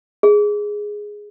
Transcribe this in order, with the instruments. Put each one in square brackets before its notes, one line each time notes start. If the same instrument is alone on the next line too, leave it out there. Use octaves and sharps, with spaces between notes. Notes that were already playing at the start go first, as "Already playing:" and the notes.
[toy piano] G#4